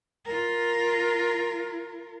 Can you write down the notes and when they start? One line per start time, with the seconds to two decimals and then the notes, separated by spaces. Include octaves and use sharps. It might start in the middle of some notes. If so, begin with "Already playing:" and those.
0.25 F4 A#4